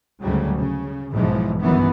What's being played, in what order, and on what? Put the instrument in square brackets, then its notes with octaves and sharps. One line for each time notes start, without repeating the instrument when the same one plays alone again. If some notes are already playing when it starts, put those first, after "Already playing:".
[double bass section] D2 G#2 C#3 F#3 G3
C#3
B1 G#2 E3 F3 G#3
G1 F#2 D#3 E3 B3